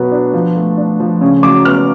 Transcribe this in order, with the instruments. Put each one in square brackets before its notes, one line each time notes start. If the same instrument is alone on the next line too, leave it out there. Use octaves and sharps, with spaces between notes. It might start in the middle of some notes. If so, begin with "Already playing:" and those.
Already playing: [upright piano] B2 F#3 B3
D4
F3
A3
D4
F3
C#3
F#3 D6
B3 F6